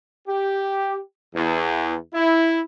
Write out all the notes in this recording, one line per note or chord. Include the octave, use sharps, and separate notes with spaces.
G4
E2
E4